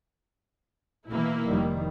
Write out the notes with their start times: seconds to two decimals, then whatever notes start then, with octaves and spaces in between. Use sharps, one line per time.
1.08 B2 E3 A#3 E4
1.48 F1 D#3 G3